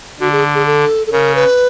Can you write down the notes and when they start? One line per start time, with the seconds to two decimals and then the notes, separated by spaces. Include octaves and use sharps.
0.20 D3 F#4
0.32 G#4
0.55 G#4
0.66 A4
1.07 A4
1.12 C#3 A#4
1.35 B4